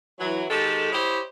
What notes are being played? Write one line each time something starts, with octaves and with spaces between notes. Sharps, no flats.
E3 F#3
D#3 G#3 G4 A4
E4 G4 C5 C#5 D#5